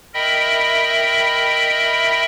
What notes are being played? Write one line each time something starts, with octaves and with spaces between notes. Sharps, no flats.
A#4 D#5 E5 G5 B5